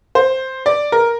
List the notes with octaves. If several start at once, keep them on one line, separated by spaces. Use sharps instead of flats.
C5
D5
A#4